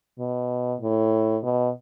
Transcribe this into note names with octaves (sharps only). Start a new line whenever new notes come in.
B2
A2
B2